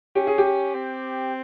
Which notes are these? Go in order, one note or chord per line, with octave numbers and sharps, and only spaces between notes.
C#4 G4
G#4
G4
C4